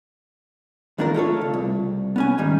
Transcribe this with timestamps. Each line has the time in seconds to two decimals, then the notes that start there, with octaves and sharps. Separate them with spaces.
0.98 D#2 A2 D4 F4 A#4
1.14 A3 F4 A4 C#5
1.41 C#3
1.54 C2
2.16 B3 C#4 G#5
2.38 G#2 D#3 G3